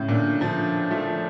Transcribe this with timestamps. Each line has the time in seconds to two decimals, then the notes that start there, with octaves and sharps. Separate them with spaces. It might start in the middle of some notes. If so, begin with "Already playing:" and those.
Already playing: A2 C#3
0.08 A#2 D3
0.41 D3 F3
0.90 F3 A3